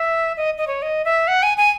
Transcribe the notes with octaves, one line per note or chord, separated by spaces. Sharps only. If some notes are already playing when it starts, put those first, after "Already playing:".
Already playing: E5
D#5
D#5
C#5
D#5
E5
F#5
G#5
G#5